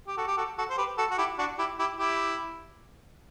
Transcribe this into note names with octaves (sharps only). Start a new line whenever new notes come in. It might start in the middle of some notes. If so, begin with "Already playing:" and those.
G4
F#4 A4
G4
F#4 A4
F#4 A4
C5
G4 B4
F#4 A4
F#4
E4 G4
D4 F#4
E4 G4
E4 G4
E4 G4